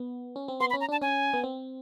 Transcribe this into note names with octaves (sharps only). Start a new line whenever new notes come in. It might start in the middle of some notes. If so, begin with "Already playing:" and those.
Already playing: B3
C#4
C4
B3 C6
B5
C#4
A#5
D4 A5
C#4 G#5
B3
C4